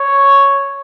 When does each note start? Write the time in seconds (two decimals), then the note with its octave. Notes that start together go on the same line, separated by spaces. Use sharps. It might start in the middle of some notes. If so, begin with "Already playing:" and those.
Already playing: C#5